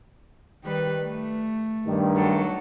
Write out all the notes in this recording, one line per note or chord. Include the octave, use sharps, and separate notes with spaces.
D#3 G3 B4
A3
G2 D#3
F#3 A4